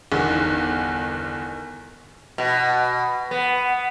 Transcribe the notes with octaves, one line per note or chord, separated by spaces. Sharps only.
G1 E2 D#3
B2
B3